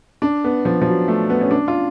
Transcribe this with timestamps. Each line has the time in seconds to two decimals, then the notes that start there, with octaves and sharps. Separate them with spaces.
0.22 D4
0.44 B3
0.65 F3
0.82 F3
0.87 F#3
1.08 A3
1.30 B3
1.41 C#4
1.51 D4
1.68 F4